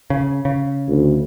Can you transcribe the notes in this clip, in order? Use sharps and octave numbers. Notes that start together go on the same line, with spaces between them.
C#3
C#3
D2